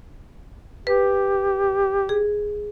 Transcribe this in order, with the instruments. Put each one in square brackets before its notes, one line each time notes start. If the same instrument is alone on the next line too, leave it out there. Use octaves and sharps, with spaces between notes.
[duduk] G4 [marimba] B4
[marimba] G#4